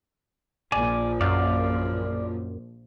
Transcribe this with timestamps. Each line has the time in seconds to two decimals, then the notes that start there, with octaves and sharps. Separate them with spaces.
0.72 A#1 A#2 F3 D5 G#5
1.21 F#2 D5 F5